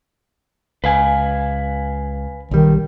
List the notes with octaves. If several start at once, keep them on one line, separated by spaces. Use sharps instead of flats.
C#2 B4 F5 G#5
B1 D#3 G3